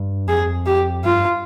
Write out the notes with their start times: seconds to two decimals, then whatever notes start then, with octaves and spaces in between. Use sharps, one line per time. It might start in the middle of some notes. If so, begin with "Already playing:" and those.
Already playing: G2
0.27 F2 G#4
0.66 G4
1.03 G2 F4